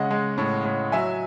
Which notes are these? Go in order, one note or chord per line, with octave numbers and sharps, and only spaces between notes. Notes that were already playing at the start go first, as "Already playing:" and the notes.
Already playing: C#3 G#3 D#5 F#5
G#3
A2
A2
F#3 E5 G#5